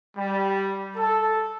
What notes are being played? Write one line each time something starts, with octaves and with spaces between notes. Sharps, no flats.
G3
A4